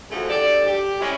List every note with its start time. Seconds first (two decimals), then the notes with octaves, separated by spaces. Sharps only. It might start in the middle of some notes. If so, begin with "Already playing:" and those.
0.10 D2 E3 F3 A3 F#4 G#4
0.28 D4 G4 A4 D5
0.66 G4
1.00 G#3 C#4 E4